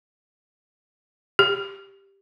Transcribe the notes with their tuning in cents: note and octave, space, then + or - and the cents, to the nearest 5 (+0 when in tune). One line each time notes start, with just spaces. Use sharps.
G4 +5